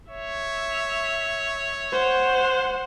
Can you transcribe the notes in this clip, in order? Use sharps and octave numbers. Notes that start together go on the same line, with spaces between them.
C#5 E5
C5 F#5